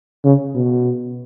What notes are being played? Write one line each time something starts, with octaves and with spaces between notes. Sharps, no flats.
C#3
B2